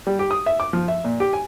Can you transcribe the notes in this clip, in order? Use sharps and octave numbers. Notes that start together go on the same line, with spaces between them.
G3
G4
D#6
E5
D6
F3
E5
A#2
G4
G#5